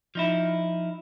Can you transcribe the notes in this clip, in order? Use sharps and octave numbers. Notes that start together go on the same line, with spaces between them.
F3 D#4 E4